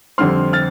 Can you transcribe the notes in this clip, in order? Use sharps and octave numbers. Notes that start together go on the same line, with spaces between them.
F2 D3 G3 C4 C6 F6
F6 A6